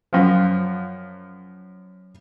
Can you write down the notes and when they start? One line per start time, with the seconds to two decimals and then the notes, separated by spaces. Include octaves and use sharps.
0.13 F#2 F3